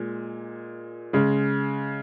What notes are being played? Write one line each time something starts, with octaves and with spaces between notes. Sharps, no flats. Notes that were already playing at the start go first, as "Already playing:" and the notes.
Already playing: A#2 G#3
C#3 G#3